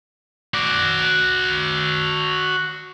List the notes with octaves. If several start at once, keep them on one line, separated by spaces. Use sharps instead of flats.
F#4 D5